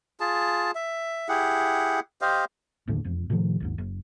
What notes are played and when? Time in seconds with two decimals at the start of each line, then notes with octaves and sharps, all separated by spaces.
0.20 F4 G#4 A5
0.75 E5
1.29 E4 G4 G#4 F#5
2.21 G4 C5 D#5 F5
2.88 G#1 D#2 A2 D3
3.04 E1 F2
3.30 A2 C3 D#3 F3
3.60 G#1 D#2 G#2
3.78 F#1